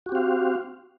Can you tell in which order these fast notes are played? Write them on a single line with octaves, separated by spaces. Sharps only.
F#4 G4 C4 F5